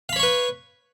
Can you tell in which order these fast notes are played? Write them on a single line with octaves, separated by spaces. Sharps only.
F5 B5 C#5 C#6 B4